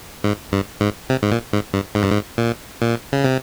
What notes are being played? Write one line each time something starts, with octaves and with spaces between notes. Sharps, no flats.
G#2
G2
G#2
C3
G#2
A#2
G#2
G2
G#2
G2
G#2
A#2
A#2
C#3
C3